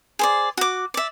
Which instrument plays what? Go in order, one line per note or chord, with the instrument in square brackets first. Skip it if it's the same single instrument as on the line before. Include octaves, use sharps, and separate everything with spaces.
[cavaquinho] G#4 C5 D5
F#4 D6
D5 E5